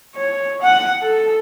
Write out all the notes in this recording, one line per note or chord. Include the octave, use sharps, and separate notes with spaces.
C#5
F#5
A4